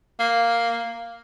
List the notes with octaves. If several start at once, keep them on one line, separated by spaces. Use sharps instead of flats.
A#3